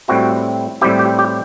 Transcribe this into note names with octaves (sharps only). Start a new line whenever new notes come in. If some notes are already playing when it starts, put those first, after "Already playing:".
A2 G3 C4 E4 F#4
A2 G3 C4 E4 G4
G4
G4